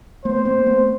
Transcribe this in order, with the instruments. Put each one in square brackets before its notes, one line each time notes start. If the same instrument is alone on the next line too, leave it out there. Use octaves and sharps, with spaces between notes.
[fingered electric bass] A3 B3 [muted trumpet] C5
[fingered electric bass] A#3 C4
A3 B3